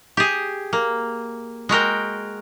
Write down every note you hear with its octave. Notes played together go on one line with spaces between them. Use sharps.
G4 G#4
A#3
G#3 F#4 A#4 G5